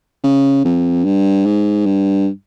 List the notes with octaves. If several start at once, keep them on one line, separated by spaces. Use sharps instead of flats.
C#3
F2
G2
G#2
G2